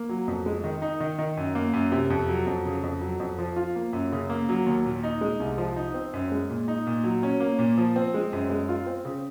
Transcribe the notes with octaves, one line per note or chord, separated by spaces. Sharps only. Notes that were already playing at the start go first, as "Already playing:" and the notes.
Already playing: A#3
F#3
F2
G#3
D#3
D#4
D#3
D#3
F#2
A#3
F#2
C3
F2
F#3
F2
C#3
F2
F#3
F2
F3
F4
A#3
F#2
C#3
A#3
F#3
D#2
A#2
D#4
G#3
C2
F3
D#4
C4
F#2
G#3
A#2
D#4
A#2
F#3
C#4
A#3
A#2
F3
C4
G#3
F#2
G#3
F4
C4
C#3